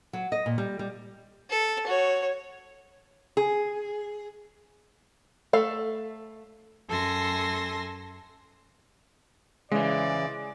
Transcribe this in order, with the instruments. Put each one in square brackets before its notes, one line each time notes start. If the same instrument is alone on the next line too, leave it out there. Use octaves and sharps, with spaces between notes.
[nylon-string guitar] F#3
D#5
A#2
G3
G3
[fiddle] A4
F#4 C#5
[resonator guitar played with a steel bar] G#4
[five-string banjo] A3 A4 F5
[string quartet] F#2 A4 G#5 C6 A#6
[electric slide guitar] C#3 E3 [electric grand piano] G#3 [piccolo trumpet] D5